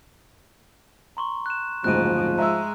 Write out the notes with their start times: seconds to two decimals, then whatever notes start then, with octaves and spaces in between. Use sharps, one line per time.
1.17 A#5 C6 C#6
1.46 F#6 E7
1.84 F#1 D2 G#2 F3 F#6 D#7
2.39 G#3 E5 A#5 E6